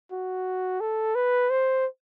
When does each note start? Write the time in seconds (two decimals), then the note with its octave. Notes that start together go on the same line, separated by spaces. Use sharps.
0.12 F#4
0.81 A4
1.15 B4
1.50 C5